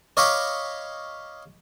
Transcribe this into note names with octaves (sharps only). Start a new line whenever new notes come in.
C#5 D#5 F5 B5 C#6 D6